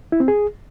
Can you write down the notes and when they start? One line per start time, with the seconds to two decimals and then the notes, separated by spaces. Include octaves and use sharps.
0.12 E4
0.20 C4
0.28 G#4